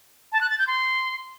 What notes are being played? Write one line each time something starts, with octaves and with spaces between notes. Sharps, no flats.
A5
F#6
A6
G6
C6